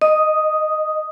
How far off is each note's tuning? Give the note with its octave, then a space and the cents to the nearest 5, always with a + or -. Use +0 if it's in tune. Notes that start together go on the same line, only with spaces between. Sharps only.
D#5 +0 D#6 +0